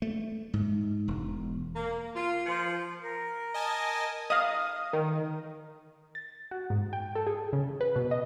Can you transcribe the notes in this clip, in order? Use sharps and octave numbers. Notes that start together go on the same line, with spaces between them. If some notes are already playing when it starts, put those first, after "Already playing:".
A3
G#2
E1
A#3
F4
F3
A#4
D#5 G#5 A5
D#5 F5 D#6
D#3
A6
F#4
G#2
G5
A4
G#4
C#3
B4
B2
D#5